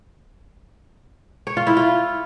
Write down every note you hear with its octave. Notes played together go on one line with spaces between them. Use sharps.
C#5
F4
E4
F4